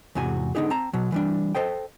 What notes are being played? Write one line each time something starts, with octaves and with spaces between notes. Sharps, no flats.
E2 G#2 C3 F#4 G#5
D3 B3 D#4 G4 G#4
C4 A5 A#5
B2 F#3
E3 G3 D4
A4 C5 D#5 G5